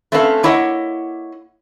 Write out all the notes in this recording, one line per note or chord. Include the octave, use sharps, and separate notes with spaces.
A3 C4 C#4 A4 B4 F5
A#3 E4 C#5 D#5 F#5